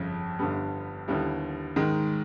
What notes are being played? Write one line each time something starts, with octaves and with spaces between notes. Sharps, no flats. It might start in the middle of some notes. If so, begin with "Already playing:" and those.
Already playing: G1 F2 C#3
G1 G2 D3 G3 B3
D#2 D3 G3 B3 E4
G#2 D#3 G#3